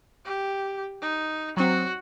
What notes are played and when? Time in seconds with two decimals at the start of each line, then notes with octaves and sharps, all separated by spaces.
0.25 G4
1.02 D#4
1.57 F#3 C4 F#4